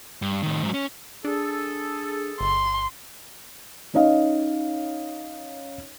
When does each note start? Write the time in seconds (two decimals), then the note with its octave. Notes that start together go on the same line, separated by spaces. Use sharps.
0.22 G2
0.43 A2 D#3
0.63 G#2 F#3
0.74 C#4
1.25 D4 G#4 A4
2.41 G1 C6
3.94 C#4 D#4 C#5 D#5 F5